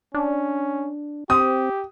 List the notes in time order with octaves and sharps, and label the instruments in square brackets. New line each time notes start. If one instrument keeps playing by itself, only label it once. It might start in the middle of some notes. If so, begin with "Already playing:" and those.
[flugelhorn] C#4 [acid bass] D4
[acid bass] C4 [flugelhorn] G4 [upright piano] D#6